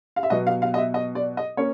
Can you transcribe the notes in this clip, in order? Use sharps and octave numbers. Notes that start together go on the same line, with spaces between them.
F5
E5
B2 F#3 B3 D#5
F5
F5
D#5
E5
D#5
D5
D#5
A#3 C#4 C#5